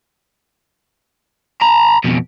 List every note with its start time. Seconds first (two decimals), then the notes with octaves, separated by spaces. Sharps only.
1.61 A#5 B5
2.04 F2 B2